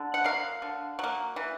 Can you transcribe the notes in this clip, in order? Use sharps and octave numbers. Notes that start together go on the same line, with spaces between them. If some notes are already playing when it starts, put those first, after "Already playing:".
Already playing: D3
F#5
F#3 A#3 F5
D3
F#3 A#3
E3